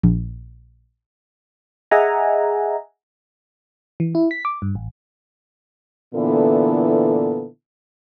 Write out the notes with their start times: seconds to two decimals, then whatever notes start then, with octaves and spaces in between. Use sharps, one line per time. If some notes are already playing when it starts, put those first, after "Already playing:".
0.03 A#1
1.91 G#4 D#5 E5 F#5 G#5 A#5
4.00 E3
4.15 E4
4.31 B6
4.45 D6
4.62 G2
4.75 A1
6.14 A#2 D3 E3 B3 E4 A4